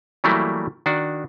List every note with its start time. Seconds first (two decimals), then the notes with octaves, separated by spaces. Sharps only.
0.24 E3 F#3 G3 A3 A#3 E4
0.86 D#3 D4 F#4